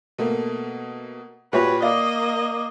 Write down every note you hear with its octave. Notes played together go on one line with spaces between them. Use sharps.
B2 A3 A#3
A#2 F#4 G4 B4 C#5
A#3 D5 D#5 F5